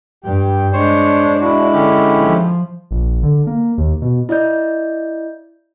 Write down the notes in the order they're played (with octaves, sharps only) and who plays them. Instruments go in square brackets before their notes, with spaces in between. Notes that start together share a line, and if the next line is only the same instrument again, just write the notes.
[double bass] G2 [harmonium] G4 G5
[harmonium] G#3 [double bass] D4 [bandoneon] C5 C#5
[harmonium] G#3 E4 [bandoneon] F#4
[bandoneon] D3 C#4 G4
[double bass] F3
[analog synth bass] A#1
D3
A#3
D#2
B2
[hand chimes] E4 D5 D#5 G6